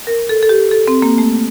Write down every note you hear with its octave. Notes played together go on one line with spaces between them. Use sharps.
A#4
A4
A4
G4
A4
C4
A#3
A3